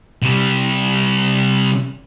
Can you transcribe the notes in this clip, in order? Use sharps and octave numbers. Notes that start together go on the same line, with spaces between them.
C3 G3